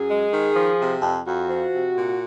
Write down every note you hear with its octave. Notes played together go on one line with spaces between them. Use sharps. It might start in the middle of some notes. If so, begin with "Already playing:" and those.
Already playing: F#2 G#4
G#3
D#3
F3
C3
F2
F2 F#4
F3
C3
A#2